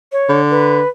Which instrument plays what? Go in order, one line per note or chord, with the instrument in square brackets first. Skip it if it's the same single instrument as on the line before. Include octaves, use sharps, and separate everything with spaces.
[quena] C#5
[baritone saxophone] D3
[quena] B4